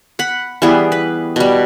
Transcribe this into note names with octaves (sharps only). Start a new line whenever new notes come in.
F#5 B5
E3 G3 B3 G#4
B4
B2 G3